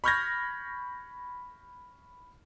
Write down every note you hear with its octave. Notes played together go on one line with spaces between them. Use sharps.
B5 C#6 F6 G6 G#6 A#6